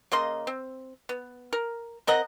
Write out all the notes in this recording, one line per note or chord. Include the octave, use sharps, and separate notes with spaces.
C#3 A#3 D#5 C6
C4
B3
A#4
C4 A#4 D#5 F#5